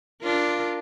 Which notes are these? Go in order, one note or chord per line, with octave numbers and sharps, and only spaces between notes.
D4 F4 A#4